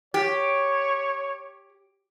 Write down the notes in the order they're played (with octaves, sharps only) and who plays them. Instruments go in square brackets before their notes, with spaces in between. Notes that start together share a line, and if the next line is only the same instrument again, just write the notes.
[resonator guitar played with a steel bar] G4 [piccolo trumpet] C#5